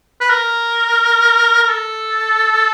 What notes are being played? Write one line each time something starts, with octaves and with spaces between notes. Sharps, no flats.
B4
A#4
A#4
A4